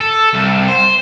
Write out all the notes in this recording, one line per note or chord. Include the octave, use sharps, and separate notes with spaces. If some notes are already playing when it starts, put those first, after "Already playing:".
A4
C2
C5